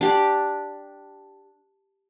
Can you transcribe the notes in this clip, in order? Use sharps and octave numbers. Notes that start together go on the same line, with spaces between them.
D4 G4 D5